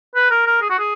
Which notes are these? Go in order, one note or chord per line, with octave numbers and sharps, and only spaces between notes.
B4
A#4
A#4
G#4
F#4
G#4